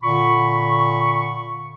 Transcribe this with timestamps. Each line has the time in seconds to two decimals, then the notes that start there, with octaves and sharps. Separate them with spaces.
0.02 A#2 D3 B5 C#6